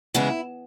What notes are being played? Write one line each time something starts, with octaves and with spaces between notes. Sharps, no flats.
C#3 E3 G#3 B3 E4